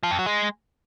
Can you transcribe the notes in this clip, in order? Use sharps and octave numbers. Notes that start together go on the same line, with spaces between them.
F3
F2
F#3
G#3